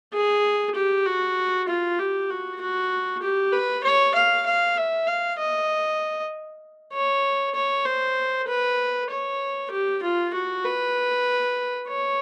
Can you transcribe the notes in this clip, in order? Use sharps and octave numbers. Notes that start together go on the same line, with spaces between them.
G#4
G4
F#4
F4
G4
F#4
F#4
G4
B4
C#5
F5
F5
E5
F5
D#5
C#5
C#5
C5
B4
C#5
G4
F4
F#4
B4
C#5